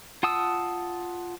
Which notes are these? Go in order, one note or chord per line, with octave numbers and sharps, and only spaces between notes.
F4 F#5 A5 D#6 E6